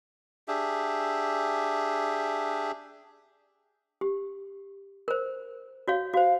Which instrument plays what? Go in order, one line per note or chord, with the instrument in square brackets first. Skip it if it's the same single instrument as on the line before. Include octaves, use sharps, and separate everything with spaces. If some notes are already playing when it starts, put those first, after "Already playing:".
[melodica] D4 G4 G#4 E5
[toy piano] G4
A#4 C5
F#4 C#5 F5
[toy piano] F#4 C5 [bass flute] F5